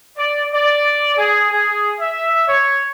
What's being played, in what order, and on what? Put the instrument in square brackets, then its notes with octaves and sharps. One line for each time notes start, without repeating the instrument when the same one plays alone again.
[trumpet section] D5
D5
G#4
G#4
E5
C#5